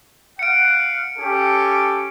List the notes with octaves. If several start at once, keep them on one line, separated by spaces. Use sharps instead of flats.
F5 F#5 C#7 D7
C#4 G4 A4